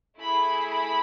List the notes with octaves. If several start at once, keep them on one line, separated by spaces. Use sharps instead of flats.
A3 E4 G#4 B5
B5